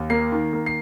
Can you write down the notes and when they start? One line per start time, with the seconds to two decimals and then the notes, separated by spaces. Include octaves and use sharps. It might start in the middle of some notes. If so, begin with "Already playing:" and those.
Already playing: D#2
0.10 A#3 C7
0.32 D#3
0.53 A#3
0.66 C7